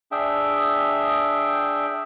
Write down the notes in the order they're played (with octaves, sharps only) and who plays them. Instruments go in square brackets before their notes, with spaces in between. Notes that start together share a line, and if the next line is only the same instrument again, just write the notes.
[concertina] D4 G#4 E5 G5